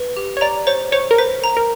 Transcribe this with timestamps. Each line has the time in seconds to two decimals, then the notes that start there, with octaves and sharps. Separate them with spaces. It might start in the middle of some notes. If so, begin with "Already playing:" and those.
Already playing: B4
0.17 G4
0.37 C#5
0.41 D5 A#5
0.67 C5 C#5
0.92 C5 C#5
1.11 A#4
1.18 B4 C5
1.44 A#5
1.57 A#4